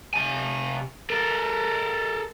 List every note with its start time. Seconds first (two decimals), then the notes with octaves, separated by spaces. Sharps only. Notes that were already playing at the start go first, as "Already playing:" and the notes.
0.14 C3 G#5
1.10 A4 A#4